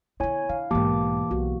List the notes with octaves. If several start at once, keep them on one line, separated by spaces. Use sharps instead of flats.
D3 B3 E4 C#5 G#5
D3 F5
B1 G#2 E3 A#3 G4 A5 D6
B1 F#4